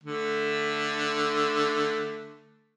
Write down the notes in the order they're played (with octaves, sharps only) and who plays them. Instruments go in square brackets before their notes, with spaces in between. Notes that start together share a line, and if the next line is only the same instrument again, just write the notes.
[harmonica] D3 A3